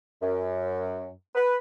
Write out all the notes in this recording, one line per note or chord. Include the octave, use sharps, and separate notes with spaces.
F#2
B4